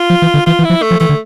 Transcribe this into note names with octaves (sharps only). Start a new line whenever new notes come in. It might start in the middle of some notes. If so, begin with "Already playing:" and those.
Already playing: F4
F3
E3
D3
E3 F4
E3
E4
F3
A3
F3
E3 A3
D3